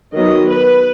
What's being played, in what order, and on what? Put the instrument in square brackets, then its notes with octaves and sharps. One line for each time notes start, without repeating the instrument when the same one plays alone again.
[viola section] D#3 F#3 B3 D#5
B4